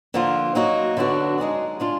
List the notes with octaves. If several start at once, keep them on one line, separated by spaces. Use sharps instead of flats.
D3 F3 A#3 F4
F#3 A#3 D#4 F#4
D3 F#3 B3 D4 F#4
G#3 D#4 G#4 D5
G#3 D4 F4